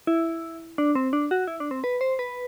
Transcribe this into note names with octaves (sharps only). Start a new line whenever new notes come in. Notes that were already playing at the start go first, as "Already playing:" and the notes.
E4
D4
C4
D4
F#4
E4
D4
C4
B4
C5
B4